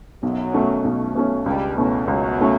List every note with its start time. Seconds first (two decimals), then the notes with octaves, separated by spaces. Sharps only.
0.23 B1 F#2 F#3
0.54 B2 A3 C#4
0.84 B1
1.15 B2 A3 C#4
1.46 C#2 G2 G3
1.77 E2 B2 E3 A3 C#4
2.08 C#2 F#2 F#3
2.39 B2 A3 C#4